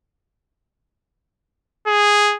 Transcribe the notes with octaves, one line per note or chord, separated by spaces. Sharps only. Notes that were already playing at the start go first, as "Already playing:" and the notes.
G#4